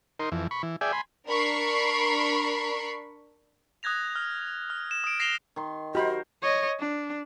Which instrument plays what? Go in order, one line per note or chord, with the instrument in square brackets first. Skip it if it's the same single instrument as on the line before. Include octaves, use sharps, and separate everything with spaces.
[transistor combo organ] D#4 A#4 C6
F2 E3
B5 C#6
E3
G#4 D5 E5 G5 G#5
G#5 B5 C6
[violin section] D4 A#4 B5 C#6 C7 D7
[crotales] D#6 F#6 G#6 A#6 F7
F6
F6
E7
D#6 D7
A#6 C7 E7 F7 G7
[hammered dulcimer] D#3 C6
[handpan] F#4 [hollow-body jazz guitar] G4 B5 [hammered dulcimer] A#4 C5 [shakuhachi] D#5
[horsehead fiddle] C#5 D#5
D4